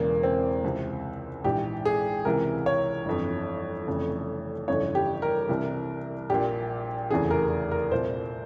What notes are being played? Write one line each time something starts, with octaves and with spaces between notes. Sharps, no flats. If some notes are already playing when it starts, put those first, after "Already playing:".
Already playing: E1 E2 C#3 E3 A#3
C4
C#2 C3 E3
A#1 G#2 E3 G4
G#4
C#2 C3 E3 A#4
C#5
G1 F2 E3
F1 F2 C#3 E3
G1 F2 C#3 E3 C#5
G4
A#4
C2 C3 E3
A#1 A#2 G4
F1 E2 C#3 E3 G#4
A#4
A#4
C2 A#2 C5